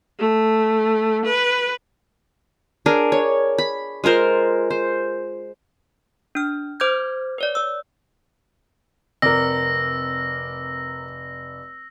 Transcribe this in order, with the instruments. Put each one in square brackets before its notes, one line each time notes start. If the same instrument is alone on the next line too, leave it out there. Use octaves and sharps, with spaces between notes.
[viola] A3
B4
[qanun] D4 G#4 A#4
C#5
B5
G#3 F4 A#4 C5
C5
[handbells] D4 F6
C5 D6 F6 G6 G#6
B4 C#5 D5
C#5 E6
[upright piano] F1 D5 [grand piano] C4 A#4 [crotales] E6 A#6